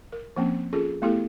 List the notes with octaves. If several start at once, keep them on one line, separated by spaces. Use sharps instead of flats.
A#4
F3 A#3 C4 C#4
C#4 F4 G#4 A4
A3 B3 E4 G4 A4